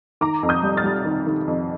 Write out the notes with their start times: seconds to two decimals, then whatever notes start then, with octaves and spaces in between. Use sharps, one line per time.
0.21 D#3 A#5 D6
0.43 F2
0.49 D#6 G6
0.63 G3
0.77 F6 A6
0.84 G3
1.05 D#3
1.27 D#3
1.48 F2